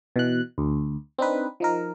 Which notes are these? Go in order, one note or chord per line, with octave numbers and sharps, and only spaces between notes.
B2 E3 F#6
D2
C4 D4 D#4 B4
F3 D#4 A#4